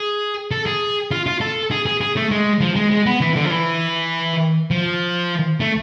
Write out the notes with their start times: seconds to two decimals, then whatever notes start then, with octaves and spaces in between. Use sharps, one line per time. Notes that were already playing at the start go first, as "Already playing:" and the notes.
Already playing: G#4
0.51 A4
0.66 G#4
1.11 F4
1.26 F4
1.41 A4
1.71 G#4
1.86 G#4
2.01 G#4
2.16 A3
2.31 G#3
2.61 F3
2.76 G#3
2.91 G#3
3.06 B3
3.21 E3
3.36 D3
3.45 F3
3.51 E3
4.71 F3
5.60 A3